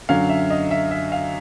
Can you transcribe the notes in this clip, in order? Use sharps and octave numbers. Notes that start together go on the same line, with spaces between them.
F#2 D3 F#3 F5
E5
D#5
E5
E5
F5